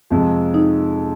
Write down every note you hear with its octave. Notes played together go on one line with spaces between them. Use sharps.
F2 C3 F3 G#3
D#4